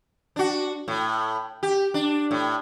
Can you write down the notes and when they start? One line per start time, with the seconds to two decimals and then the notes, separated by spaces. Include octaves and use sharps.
0.36 D4 F#4
0.88 A2
1.63 G4
1.94 D4
2.31 A2